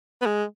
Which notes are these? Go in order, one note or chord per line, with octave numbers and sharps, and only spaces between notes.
B3
G#3